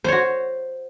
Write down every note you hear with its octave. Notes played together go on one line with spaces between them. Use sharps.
F#4 C5 C#5